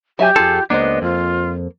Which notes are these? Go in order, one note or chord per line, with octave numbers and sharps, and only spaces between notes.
F#3 G4 E5 G#5
F2 F4 G#4 A4
C#2 A#3 B3 D4 C5 D#5
F2 F4